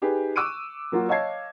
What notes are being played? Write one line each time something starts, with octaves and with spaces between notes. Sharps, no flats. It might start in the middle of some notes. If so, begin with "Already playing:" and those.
D#4 G4 G#4 B4
C#6 D6 E6 F#6 D7 D#7
F#3 A#3 F4 F#4
C#5 D#5 F5 A5 G#6 C7